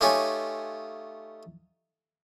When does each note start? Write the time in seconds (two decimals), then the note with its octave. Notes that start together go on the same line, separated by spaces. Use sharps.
0.01 A3 D#4 F4 G4 C#5 G#5